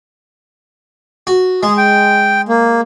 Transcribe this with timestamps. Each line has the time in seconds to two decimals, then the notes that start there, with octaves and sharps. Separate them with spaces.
1.27 F#4
1.63 G#3 G#4
1.78 G5
2.49 A#3